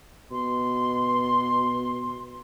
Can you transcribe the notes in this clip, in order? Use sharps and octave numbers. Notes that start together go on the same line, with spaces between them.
B2 C6